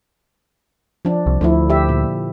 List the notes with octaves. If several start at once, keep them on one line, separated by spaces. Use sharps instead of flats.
F3 D4
C2
D2 D3 F3 E4
G4 E5
A#2